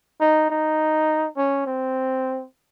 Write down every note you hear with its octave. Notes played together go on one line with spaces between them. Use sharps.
D#4
D#4
C#4
C4